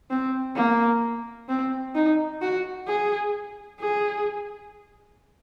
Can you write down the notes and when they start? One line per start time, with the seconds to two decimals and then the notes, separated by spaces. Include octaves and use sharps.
0.10 C4
0.56 A#3
1.49 C4
1.95 D#4
2.42 F#4
2.88 G#4
3.81 G#4